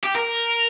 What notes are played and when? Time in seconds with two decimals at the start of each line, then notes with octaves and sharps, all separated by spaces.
0.04 G4
0.16 A#4